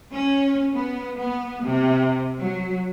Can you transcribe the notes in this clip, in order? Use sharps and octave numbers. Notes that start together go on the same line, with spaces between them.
C#4
B3
B3
C3
F#3